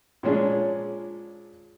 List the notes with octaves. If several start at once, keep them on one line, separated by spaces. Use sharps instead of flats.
A#2 F3 G#3 C#4 D4 G#4